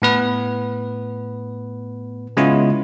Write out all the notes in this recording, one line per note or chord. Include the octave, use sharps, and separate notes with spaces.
A2 B3 B4
C#3 G#3 B3 C#4 E4 F4